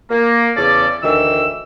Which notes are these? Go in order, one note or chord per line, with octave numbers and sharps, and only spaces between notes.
A#3
E2 C#3 C#4 A4 D5
D2 D#3 E3 E6